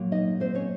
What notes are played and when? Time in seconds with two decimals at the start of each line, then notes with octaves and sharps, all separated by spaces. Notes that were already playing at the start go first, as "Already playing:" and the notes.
Already playing: A#2 F#3 A#3
0.12 D#4 D#5
0.40 C4 C5
0.55 C#4 C#5